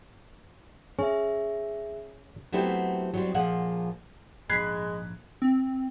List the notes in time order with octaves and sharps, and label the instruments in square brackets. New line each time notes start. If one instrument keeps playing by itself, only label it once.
[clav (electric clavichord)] C#4 [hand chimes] G#4 E5
[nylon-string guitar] F#3 A3 B3 C4 E4 G4
F#3 G3 C4
A#2 F3 G#4 F#5
[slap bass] A#1 G#2 [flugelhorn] G#3 [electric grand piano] B5 F#6 G#6 [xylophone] B6 C7
[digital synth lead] C4